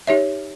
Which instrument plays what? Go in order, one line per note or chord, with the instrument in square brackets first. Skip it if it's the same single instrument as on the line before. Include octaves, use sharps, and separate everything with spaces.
[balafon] D#4 G4 C#5 E5